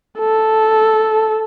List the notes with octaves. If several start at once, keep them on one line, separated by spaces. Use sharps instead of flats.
A4